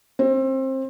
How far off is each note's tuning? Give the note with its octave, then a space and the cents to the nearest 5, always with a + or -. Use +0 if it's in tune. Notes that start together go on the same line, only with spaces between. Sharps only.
C4 +25